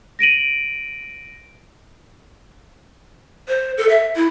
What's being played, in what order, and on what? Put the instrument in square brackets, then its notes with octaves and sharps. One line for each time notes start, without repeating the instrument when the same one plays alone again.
[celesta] A#6 D7 D#7 F#7
[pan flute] C5
A4
E5
E4